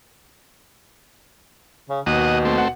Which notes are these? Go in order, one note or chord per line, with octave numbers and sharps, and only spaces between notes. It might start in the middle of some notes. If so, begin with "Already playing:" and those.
C#3
D#2 B2 F#4 D#5
A3 C4
F#5